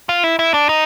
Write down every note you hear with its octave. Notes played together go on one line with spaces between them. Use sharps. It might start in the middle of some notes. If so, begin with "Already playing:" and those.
F4
E4
E4
D4
D#4